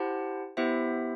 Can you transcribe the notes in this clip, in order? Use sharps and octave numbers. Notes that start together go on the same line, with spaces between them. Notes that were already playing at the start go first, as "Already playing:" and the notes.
Already playing: E4 G4 C5 F#5 A5
B3 E4 G4 C5 E5